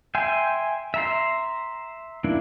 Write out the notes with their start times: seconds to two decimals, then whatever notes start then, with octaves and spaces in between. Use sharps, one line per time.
0.15 E5 G5 G#5 C6
0.94 E5 A#5 C6
2.24 A#3 D4 E4